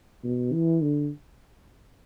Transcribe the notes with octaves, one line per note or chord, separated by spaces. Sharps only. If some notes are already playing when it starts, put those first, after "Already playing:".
B2
E3
D3